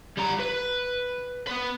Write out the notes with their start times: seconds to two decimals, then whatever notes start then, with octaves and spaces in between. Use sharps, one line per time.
0.18 G3 A#5
0.40 B4
1.47 B3 B4